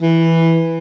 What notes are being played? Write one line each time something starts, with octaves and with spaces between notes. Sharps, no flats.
E3